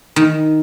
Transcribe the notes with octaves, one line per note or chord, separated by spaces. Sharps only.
D#3